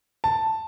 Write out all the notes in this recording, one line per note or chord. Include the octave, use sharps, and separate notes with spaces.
A5